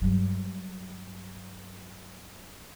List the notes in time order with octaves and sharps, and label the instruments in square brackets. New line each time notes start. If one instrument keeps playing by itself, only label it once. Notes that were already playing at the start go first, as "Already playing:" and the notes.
[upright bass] G2 F#3